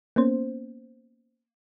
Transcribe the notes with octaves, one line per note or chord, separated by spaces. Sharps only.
A#3 B3 C#4 C5